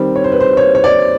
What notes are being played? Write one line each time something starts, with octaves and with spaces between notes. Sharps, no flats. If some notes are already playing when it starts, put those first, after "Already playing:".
Already playing: D#3 G3 C4
C#5
C5
B4
C5
C#5
C#5
D5